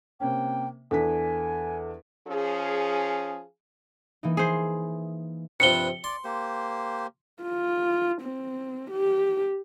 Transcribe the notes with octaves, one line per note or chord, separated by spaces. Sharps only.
C3 A#3 C#4 G5
E2 D4 A4 G#5 B6
F3 C#4 G#4
E3 A#3 D#4
G#4 C5
G2 C3 F3 B4 C#7 G7
D5 C6
A#3 G4 C5
F4
C4
G4